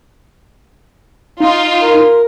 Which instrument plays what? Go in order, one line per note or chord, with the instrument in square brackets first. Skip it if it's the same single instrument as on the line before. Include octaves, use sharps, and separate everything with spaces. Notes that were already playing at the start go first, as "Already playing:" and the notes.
[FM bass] D#4 [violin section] F4
[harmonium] A#4